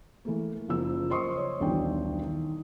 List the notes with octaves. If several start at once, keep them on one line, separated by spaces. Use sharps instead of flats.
E3 A3 A#3
F#1 F3 A#3 E6
C5 D#5 C6 C#6 D#6
C#5
D#1 B1 E3 D4 F#4 G5
D#3